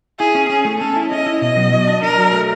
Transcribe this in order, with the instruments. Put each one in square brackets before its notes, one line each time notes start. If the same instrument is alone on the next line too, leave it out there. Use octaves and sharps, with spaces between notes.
[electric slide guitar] E4 [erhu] G#4
[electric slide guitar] C#4
[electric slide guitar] C#4 [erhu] G#4
[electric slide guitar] A3
[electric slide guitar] C#4 [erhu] A4
[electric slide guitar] E4
[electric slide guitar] C#4 [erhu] D#5
[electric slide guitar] E4
[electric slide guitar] B2 [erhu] D#5
[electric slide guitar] F#3
F#3
D4
[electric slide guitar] D4 [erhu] A#4
[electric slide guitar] F#3
A3